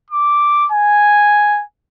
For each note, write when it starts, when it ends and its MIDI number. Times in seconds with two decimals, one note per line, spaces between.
0.11 0.67 86
0.72 1.63 80